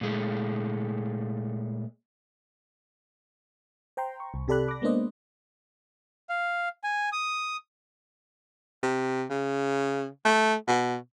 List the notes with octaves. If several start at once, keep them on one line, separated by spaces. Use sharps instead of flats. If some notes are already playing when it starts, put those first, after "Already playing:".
A#2 G#3 A3
C5 G5 A#5 C6
C#6
C2
C3 G4 A4 D5 B5 F#6
D6 A#6
G#3 A#3 B3 D4 C5 D#5
F5
G#5
D#6
C3
C#3
A3
B2